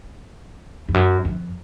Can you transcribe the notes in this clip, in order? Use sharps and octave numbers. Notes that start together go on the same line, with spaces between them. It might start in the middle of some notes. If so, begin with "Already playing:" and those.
F2
F#2
F2